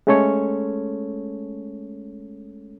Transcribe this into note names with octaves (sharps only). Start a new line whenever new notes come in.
G#3 A3 C#4 A4 C#5